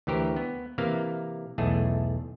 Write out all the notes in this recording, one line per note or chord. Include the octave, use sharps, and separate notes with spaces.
D2 E3 G4 A#4 C5
B3
C3 E3 A#3 F5
B1 E2 A3 G#4